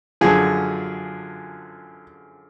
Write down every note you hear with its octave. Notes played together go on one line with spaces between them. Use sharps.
F#2 D3 F3 G#4